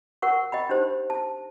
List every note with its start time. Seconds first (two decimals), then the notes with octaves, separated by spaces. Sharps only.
0.22 A#4 F#5 C#6
0.52 D#5 G5 B5
0.69 D4 D#4 G4 C5
1.10 A5